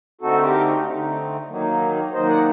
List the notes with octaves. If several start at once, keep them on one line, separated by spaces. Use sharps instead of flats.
D3 A3 C4 D#4 F#4 A4
G4 A#4
D3 A3 C4 D#4
D#3 F#3 A#3 D#4
D#3 F#3 A#3 D#4 C5 D#5
D5 F#5